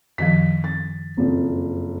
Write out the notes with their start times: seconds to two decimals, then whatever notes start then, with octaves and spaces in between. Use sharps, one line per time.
0.18 F#2 D#3 F3 B6
0.64 A6
1.17 F#1 F2